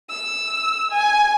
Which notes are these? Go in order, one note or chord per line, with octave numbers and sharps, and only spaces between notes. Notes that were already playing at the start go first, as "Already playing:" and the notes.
E6
G#5